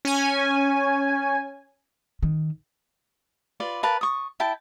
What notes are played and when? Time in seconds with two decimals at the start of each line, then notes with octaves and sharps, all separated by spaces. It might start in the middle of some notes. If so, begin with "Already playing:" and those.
0.05 C#4 G#5
2.23 D#3
3.60 F4 B4 D5
3.83 A#4 B4 F5 A5
4.01 C#6 D#6
4.40 E4 G5 A5